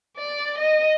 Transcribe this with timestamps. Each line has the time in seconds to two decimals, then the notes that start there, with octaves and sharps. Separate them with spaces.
0.18 D5
0.58 D#5